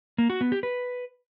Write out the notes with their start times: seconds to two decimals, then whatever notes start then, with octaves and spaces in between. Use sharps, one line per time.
0.18 A#3
0.30 F#4
0.41 B3
0.52 G4
0.63 B4